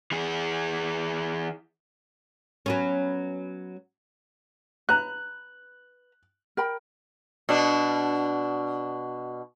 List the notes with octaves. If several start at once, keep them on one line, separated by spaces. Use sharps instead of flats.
E3 G#4
F#3 B3 C#4
B4 A#5 F#6
A#4 G5 B5
B2 D4